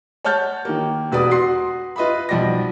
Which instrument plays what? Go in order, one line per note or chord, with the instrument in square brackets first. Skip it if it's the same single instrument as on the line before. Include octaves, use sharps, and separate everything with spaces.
[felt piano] C#5 F#5 A5 F6 G6 A6
D#3 A#3
E1 F#4 B4 D5 D#6
F#4 C6 C7
F4 B4 D#5 E5 B5
B1 F3 G3 D5 F#5 A#6